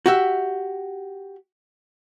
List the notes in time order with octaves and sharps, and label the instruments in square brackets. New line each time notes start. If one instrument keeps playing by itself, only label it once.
[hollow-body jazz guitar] F#4 G4 E5